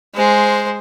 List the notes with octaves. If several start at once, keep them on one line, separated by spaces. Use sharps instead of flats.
G#3 C5